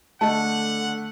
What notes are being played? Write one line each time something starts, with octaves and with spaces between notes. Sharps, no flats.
D3 A3 D#5 F#5 A5